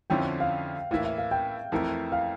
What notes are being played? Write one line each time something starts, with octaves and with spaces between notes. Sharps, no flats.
F2 D3 F3 C#4 E4 G5
F5
A2 E3 A#3 E4 F5
E5
F5
G5
F2 E3 A3 E4 A#4
F5